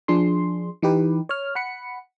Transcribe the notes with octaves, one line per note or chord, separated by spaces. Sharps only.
F3 D4 G#4 C6
E3 D#4 G4 B4
C#5 F6
F#5 B5 C#7